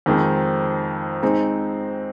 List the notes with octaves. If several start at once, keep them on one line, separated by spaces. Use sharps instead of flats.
F2 D#3 G#3 C4
G#3 C4 D#4